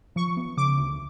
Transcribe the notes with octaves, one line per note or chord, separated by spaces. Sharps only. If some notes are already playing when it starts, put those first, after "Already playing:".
F3 C#6
B3
C#3 D6
D2